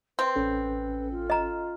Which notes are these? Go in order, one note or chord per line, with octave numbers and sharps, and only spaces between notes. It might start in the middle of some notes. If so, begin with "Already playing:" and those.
C4 B4
A1 C#4 A4
F4
D#5 A#5